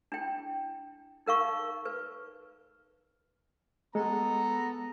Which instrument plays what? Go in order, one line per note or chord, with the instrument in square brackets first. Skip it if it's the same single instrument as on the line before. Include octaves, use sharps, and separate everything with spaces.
[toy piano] D4 E4 G5
D#4 A#4 F5 C#6
B4
[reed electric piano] G#3 [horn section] B3 A4 A#5